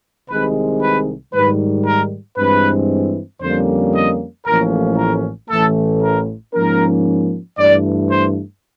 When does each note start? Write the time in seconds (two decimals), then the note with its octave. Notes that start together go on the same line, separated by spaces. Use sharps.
0.29 C2 C3 D#3 G#3 B4
0.82 B4
1.33 G#2 D#3 G3 B4
1.86 A#4
2.37 G2 E3 G#3 C4 B4
3.42 F2 D3 G3 A#3 C#4 C5
3.94 D#5
4.46 A1 A2 F3 A#3 C#4 A#4
4.97 A#4
5.50 A1 A2 E3 A3 A4
6.02 A#4
6.54 G#2 F3 A#3 C#4 A#4
7.58 G2 E3 A3 D5
8.10 C5